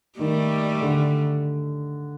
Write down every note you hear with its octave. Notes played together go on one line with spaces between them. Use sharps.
D#3 G3 A3
D3